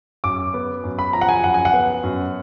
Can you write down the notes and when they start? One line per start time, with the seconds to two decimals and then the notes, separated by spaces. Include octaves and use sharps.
0.24 F#2 D6
0.54 B3
0.84 F#2
0.99 B5
1.13 F3 A#5
1.21 F#5
1.29 G#5
1.43 F#2 F#5
1.54 G#5
1.65 F#5
1.73 B3
2.04 F#2